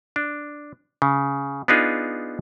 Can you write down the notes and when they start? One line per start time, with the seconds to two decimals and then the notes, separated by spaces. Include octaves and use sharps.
0.16 D4
1.02 C#3
1.68 B3 D4 D#4 F4 G#4